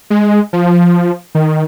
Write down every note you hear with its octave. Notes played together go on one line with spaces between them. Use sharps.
G#3
F3
D#3